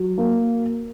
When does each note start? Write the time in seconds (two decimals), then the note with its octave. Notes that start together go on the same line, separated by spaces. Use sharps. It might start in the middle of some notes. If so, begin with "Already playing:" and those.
Already playing: F#3
0.18 A#3